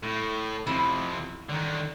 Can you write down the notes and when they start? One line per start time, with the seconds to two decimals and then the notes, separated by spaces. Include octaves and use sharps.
0.03 A2
0.67 F2 C3 E4
1.49 D3 D#3